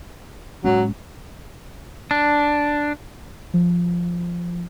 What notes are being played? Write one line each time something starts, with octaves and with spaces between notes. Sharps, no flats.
A2 F#3 G#3 C#4
D4
F3